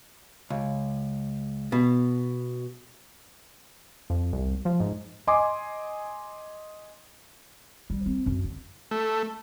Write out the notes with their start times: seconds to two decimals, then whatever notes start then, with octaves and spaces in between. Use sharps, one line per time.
0.50 C#2
1.72 B2
4.10 F2
4.33 C2
4.65 F3
4.80 G#2
5.27 D#5 G#5 C6 D6
7.90 G3
8.06 C4
8.26 F#2
8.44 D3
8.91 A3